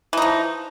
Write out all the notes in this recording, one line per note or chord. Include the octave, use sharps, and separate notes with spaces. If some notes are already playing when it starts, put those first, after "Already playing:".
E3 F3 D#4